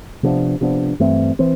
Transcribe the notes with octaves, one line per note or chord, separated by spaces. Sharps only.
C3 F3 B3 D4
C3 F3 B3 D4
G2 E3 A3 C4
E3 C4